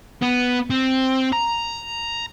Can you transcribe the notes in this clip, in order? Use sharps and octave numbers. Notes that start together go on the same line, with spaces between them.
B3
C4
A#5